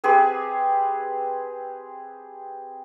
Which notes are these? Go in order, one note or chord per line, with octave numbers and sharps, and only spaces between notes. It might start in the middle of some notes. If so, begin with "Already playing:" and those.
C4 G4 G#4 B4